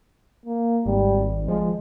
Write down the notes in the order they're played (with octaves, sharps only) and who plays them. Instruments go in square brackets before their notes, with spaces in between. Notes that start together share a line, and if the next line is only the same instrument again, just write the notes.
[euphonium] A#3
[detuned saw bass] G#1 [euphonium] G3
[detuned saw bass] F3 [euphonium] G#3